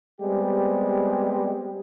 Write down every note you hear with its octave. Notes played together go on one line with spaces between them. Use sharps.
G3 G#3 B3 C4 G4